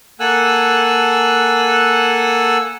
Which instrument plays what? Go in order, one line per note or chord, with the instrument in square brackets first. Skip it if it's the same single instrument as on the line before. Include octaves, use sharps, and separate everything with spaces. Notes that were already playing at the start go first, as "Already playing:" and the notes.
[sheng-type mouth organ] A#3 A4 F#5 G#5 E6 F#6